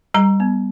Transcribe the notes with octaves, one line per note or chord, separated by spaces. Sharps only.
G3 A#5
B3